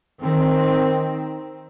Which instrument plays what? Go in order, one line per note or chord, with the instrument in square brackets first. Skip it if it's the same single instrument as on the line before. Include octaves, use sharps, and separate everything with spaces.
[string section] D#3 C4